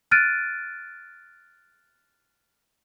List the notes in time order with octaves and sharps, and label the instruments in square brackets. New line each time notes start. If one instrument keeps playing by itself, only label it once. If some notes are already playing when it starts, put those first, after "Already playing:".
[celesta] F6 F#6 A6 D7 D#7